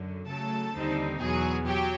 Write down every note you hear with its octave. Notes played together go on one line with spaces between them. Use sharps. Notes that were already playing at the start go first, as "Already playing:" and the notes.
Already playing: F#2 D3 F#3
C#3 F#3 A3 A4 A5
D#2 D3 G3 C4 D#4
E2 B2 F#3 B3 G#4 G#5
F#3 G4 G5